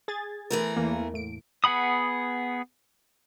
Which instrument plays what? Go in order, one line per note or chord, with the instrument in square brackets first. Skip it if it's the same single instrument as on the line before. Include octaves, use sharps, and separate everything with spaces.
[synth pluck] G#4 G#6 A6
[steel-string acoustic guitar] E3 A3 A#4
[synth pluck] E2 A#3
A2 D7
[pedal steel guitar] B3 G#4 F#5 B5 D#6